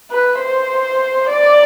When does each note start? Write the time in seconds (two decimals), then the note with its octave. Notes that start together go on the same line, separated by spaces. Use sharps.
0.11 B4
0.40 C5
1.30 D5